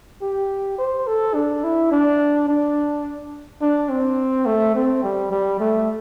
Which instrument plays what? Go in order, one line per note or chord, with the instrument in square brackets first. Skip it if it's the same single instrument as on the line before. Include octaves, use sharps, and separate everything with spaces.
[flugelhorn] G4
C5
A4
D4
E4
D4
D4
D4
C4
A3
C4
G3
G3
A3